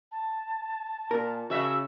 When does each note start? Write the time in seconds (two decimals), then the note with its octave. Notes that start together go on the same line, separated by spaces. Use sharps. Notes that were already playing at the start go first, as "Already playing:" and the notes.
0.11 A5
1.11 A#2 A#4
1.50 C#3 F#4 E5